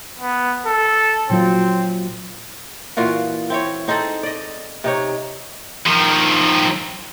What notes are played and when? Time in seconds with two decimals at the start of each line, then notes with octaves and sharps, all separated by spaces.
0.20 B3
0.66 A4
1.30 A#2 F#3 C4 F4
2.97 A#2 E3 F4 F#4
3.50 C4 E4 C#5
3.88 C4 D#4 G#4 A4
4.23 D5 D#5
4.84 C3 D#4 C#5
5.86 D#3 F3